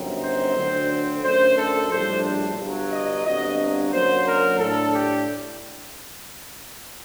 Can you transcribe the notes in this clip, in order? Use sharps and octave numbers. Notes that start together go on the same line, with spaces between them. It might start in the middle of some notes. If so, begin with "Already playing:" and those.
Already playing: G1 F#2 F#3 C4 D#4
C5
D2 D3 F#3 C4
F#2 D3 A3 C5
A4
A#1 A2 G3 D4 C5
G1 G2 F#3
D#5
G1 G2 D3 F#3 C4 D#5
F#2 D3 F#3 A#3 C5
A#4
A2 A3 D4 A4
G4